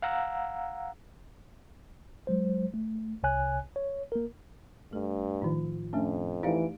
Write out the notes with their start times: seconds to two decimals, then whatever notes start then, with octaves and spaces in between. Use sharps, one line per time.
0.02 F5 F#5 A#5 E6
2.27 F#3 G#3 C5
2.74 A3
3.23 C2 C3 C#5 G#5 F#6
3.76 C#5
4.12 A#3 A#4
4.93 G2 A3 A4
5.42 A2 D#3 F3 D#4 F4
5.93 F2 A3 C#4 D4
6.43 E3 A3 D#4 G4 D5 F5 D7